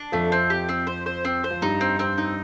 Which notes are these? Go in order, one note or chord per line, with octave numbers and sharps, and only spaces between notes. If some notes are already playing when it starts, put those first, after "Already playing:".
Already playing: D4
F2 F3 A3
C4
G4
C4
C5
C5
C4
C5
F3
G2 G3 D#4
C4
C4
D#4